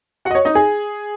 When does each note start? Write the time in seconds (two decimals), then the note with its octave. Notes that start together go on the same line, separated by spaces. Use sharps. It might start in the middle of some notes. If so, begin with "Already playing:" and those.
0.25 F#4 F#5
0.31 D#5
0.35 C#5
0.45 D#4 D#5
0.55 G#4 G#5